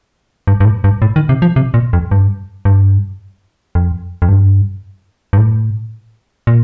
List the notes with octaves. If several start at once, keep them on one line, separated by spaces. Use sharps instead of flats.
G2
G2
A2
G2
A2
D#3
C3
F3
C3
A#2
F2
G2
G2
F2
F2
G2
G2
A2
A#2